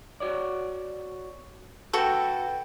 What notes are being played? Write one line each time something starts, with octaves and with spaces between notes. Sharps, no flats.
F#4 C#5 D5
F#4 A4 B4 G5